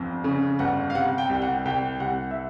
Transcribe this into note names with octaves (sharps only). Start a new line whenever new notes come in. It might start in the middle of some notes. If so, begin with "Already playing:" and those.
Already playing: G1 F2
C#3
G1 F#5
F5
C3 F#5
G5
C2
F#5
C2 G5
C2 F#5
E5